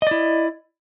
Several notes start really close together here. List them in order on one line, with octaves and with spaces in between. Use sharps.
D#5 D5 E4